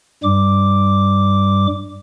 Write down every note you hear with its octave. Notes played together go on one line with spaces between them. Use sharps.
G2 G3 D6